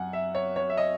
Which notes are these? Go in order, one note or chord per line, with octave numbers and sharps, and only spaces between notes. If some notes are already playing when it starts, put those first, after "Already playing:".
Already playing: F#2 F#5 G#5
E5
C#5
C#5
E5
D#5